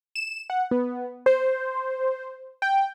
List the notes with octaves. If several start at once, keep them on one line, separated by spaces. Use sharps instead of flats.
E7
F#5
B3
C5
G5